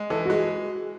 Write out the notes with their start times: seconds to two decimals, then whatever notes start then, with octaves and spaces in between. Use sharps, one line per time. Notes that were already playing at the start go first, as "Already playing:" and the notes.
Already playing: G#3
0.10 E3 A4
0.25 F#4
0.30 G#3 G#4